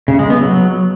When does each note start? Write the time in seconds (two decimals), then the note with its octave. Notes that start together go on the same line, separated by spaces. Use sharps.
0.08 C#3
0.19 G#3
0.30 B3
0.41 F#3